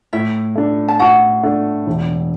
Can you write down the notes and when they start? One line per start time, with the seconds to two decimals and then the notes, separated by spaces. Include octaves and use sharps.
0.13 A2 E4 E5
0.56 A3 D4
0.88 A5
0.99 A2 F#4 F#5
1.43 A3 D4
1.87 E1